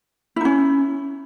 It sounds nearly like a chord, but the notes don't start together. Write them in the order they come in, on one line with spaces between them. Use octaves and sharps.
E4 D#4 C#4